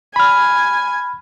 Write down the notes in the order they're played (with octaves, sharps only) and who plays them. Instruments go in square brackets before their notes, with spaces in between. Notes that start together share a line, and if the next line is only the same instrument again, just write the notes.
[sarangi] G#5 [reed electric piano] B5 F6